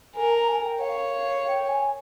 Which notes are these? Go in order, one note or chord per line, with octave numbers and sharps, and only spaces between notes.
A#4 G#5
A#5
G#5
G#5
G5
C#5 F5
F5
G5
G#5